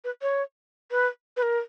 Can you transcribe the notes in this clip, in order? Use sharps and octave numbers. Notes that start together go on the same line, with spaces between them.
B4
C#5
B4
B4
A#4